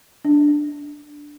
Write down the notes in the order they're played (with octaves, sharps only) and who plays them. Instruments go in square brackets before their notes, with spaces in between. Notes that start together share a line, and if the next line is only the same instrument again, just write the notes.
[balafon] D4